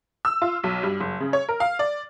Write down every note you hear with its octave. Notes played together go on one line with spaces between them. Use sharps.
E6
F4
B1
G2
F#1
C#3
C#5
A#4
F5
D5